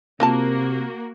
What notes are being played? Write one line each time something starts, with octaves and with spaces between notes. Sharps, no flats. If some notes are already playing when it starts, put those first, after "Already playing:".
C3 A#3 C4 F4 F#4 A5